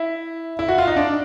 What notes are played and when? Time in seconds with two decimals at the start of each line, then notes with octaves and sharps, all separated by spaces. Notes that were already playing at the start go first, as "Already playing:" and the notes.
Already playing: E4
0.59 E4
0.69 F#4
0.78 F4
0.88 D#4
0.96 D4